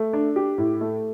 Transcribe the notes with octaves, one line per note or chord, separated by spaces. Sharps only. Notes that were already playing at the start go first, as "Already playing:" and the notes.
Already playing: A3
D4
G4
A2
A3